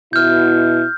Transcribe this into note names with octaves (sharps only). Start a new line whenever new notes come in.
B2 E4 F6 G6